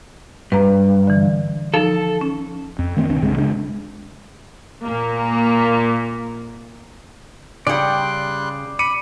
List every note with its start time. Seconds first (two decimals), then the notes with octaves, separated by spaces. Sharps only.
0.52 G2 B4 A#5
1.07 D3 E3
1.74 F3 D#4 A4 F5
2.21 C#4
2.79 F2
2.97 D#3 A3 C4
3.09 C2 B2 C4 D4
3.22 C2 G2 C#3 G#3
3.36 C#3 G#3 D4
4.83 A#2 A#3
7.67 C#3 G3 D5 F#5 G5 C6 F#6
8.79 B5 D6 C#7 D#7